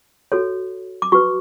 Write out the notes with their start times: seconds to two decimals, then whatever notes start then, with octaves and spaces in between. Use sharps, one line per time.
0.32 F#4 A4 C#5
1.02 D6
1.12 F#4 B4 C#6